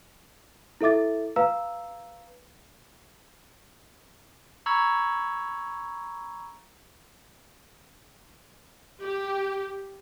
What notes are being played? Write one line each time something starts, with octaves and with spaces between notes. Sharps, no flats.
E4 A4 E5 D6 A6
B4 F5 A#5 E6
A#5 B5 C#6 E6 G#6
G4